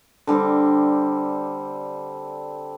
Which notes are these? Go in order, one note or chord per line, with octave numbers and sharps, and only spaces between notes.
D3 G3 C4